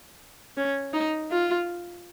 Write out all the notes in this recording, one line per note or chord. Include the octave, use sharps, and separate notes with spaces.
C#4
D#4
F4